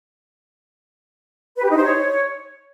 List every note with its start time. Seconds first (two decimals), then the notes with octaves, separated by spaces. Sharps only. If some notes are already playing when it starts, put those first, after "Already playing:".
1.56 B4
1.63 G4
1.70 D#4
1.77 C5
1.84 C#5